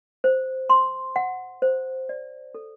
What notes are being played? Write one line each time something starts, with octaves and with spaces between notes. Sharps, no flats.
C5
C6
F#5
C5
D5
A4